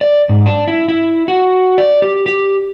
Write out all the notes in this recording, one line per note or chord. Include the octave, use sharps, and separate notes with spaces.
D5
G#2
D4
E4
E4
F#4
D5
G4
G4